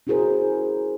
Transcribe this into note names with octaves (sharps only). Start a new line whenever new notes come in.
C#4 E4 F#4 G#4 A#4 C5